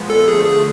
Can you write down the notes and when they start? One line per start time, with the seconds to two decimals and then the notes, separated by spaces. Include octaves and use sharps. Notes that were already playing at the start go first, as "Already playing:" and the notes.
Already playing: A#2 F3 G#3 B3
0.10 A4
0.28 D3 F3 A3 G#4
0.46 G#4